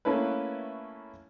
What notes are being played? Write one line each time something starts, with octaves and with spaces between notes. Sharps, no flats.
A3 A#3 C#4 E4 B4